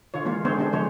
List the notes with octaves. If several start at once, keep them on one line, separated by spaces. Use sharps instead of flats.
D3 F4 C#5
E3 G#3 A#3 F4
D3 G#3 B3 C4 C5 C#5
D3 G#3 D4 G4 C5
D3 F3 G#3 C5 C#5